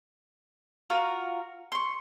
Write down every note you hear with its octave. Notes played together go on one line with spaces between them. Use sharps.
F4 F#4 A#4 F5
C6 C#6